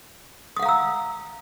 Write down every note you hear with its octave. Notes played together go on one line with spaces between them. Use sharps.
F5 F#5 A#5 D#6 E6